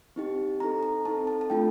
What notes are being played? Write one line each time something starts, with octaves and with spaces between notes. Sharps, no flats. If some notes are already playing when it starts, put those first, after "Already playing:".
C4 D#4 G4
C4 D#4 A4 A#5
A#5
C4 D#4 A4 A5
A5
A5
A3 D4 F4 A4 G5